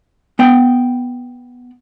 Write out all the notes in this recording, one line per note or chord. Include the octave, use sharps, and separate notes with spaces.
B3 F#5 G5